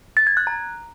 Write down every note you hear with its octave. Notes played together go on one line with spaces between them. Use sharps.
A6
G#6
F#6
A#5